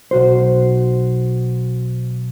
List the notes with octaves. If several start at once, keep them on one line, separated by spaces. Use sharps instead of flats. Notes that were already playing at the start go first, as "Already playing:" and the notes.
B1 F#4 C5